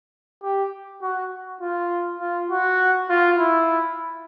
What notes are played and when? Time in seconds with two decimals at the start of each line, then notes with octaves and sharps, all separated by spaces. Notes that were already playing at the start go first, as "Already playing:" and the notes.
0.42 G4
1.02 F#4
1.61 F4
2.20 F4
2.50 F#4
3.09 F4
3.38 E4